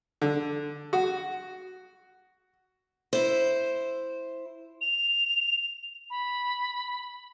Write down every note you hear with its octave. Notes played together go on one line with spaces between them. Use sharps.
D3
F#4
E4 C5
F7
B5